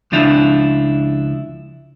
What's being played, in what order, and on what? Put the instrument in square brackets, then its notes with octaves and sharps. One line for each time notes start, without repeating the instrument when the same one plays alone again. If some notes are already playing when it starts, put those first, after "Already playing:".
[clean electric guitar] C#2 F3 D4 E4 F4